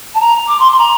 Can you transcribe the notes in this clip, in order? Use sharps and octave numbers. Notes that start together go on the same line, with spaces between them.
A5
A#5
D6
C6
C6
A#5